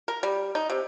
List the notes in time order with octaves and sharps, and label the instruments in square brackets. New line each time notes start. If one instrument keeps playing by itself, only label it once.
[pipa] A#4
G3
D#4
C3